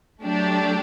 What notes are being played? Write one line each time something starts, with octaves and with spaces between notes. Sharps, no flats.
F#3 A3 D4 G4